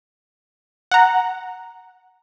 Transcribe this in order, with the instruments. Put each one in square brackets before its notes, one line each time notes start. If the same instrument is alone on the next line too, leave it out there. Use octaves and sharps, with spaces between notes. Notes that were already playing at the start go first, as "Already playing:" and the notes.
[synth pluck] F#5 A#5